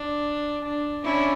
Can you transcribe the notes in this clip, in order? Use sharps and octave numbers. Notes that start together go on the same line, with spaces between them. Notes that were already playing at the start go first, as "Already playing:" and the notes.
Already playing: D4
D4
C#4 D4 E4